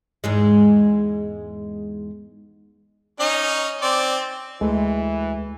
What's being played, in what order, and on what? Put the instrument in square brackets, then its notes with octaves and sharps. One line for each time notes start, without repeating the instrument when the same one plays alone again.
[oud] E2 G#2 G#3
[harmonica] C#4 D#4 D#5
C4 D5
[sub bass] D2 [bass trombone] E3 [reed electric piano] G#3 A3